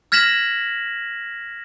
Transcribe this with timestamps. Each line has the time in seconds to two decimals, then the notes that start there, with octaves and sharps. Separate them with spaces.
0.12 F6 G#6 A#6 B6 E7 F#7